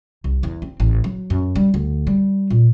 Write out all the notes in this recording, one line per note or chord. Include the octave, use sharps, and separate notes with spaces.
C2
E2
C4
A1
F#3
F#2
G3
D2
G3
A#2